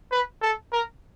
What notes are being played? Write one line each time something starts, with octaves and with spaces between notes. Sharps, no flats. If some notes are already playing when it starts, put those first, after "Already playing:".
B4
A4
A#4